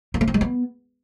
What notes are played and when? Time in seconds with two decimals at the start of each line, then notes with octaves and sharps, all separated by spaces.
0.14 A#3
0.21 A3
0.28 C4
0.34 G#3
0.41 B3